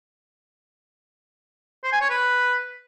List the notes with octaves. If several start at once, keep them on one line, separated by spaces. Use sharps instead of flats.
C5
G#5
C#5
B4